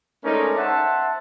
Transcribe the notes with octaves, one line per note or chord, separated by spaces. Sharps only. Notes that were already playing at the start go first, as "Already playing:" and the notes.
G#3 A3 C#4 D#4 A#4 D5
C5 E5 F#5 A5